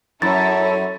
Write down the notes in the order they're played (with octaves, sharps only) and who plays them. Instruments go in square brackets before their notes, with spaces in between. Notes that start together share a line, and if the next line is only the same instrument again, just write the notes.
[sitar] F#2 [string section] E4 A4 C#5 [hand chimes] A6